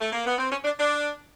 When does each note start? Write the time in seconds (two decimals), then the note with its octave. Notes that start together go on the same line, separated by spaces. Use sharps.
0.00 A3
0.12 A#3
0.25 B3
0.38 C4
0.51 C#4
0.64 D4
0.79 D4